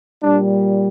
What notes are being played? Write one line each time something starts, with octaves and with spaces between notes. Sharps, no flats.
A#2 G3 D4